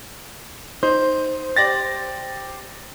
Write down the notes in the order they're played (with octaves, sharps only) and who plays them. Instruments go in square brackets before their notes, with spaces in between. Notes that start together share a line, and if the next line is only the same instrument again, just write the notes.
[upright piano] D#4 [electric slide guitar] C5
[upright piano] G4 D5 [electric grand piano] A6 A#6